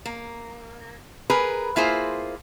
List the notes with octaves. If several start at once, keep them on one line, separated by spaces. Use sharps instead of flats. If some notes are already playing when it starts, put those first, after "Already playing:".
A#3
G#4 A#4 B4
A#3 E4 F4 G#4 C5